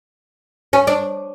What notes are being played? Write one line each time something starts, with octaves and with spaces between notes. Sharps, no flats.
C#4
D4